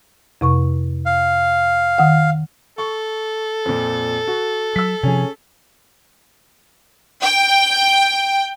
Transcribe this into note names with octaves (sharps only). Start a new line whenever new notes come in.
F2 C3 C#6
F5
D#3 F#5
A4 C#6
F2 A#2
F#4
F#3 E6 B6
C3 F3 C#4 G#4
G5